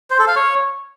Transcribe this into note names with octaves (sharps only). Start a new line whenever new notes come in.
C5
A4
F5
C#5